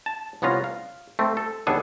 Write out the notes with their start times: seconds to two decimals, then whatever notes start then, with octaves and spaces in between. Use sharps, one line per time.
0.06 A5
0.42 C2 B3 C#4 F4 A#5
0.64 F5
1.19 A3 C4
1.37 A4
1.67 D#2 B3 D4 G#4 A4 G#5